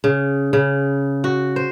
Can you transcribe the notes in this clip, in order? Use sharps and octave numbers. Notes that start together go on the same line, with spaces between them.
C#3
C#3
F#4
C5